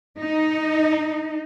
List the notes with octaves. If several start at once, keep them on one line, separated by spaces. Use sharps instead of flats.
D#4